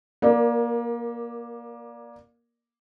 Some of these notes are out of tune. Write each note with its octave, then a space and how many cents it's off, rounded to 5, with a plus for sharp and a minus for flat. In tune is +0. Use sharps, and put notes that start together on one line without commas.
A#3 +25 A#4 +0 D5 +0